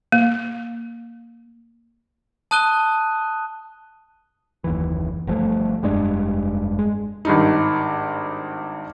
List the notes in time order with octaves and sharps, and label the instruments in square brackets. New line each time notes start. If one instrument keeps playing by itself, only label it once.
[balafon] A#3
[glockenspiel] A5 D#6 F#6 D#7 G7
[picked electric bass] F#1 D#2 E3
G1 F3 A3
F1 G2 G#3 D4
G#3
[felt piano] G#1 G2 D#4